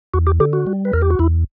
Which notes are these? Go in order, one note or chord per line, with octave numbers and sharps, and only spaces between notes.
E2 F#4
G4
D3 G4
F#4
G3
B4
E2 A#4
G4
F#4
E2 E4